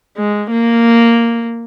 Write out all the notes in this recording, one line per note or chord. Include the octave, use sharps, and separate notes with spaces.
G#3
A#3